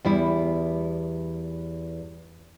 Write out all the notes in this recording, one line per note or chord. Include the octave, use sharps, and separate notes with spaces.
E2 G3 E4